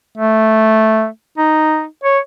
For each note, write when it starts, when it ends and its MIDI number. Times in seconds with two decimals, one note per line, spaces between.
0.18 1.07 57
1.38 1.85 63
2.04 2.18 73